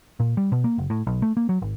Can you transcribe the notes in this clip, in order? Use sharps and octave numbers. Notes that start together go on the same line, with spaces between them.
A#2
G3
B2
A#3
F#1
A2
B1
A3
A#3
F#3
G#1